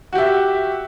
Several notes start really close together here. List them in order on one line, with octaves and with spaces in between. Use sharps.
F#4 G4 E5